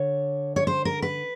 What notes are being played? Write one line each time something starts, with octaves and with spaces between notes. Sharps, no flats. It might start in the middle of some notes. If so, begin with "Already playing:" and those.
Already playing: D3 C#5
C#5
C5
A#4
B4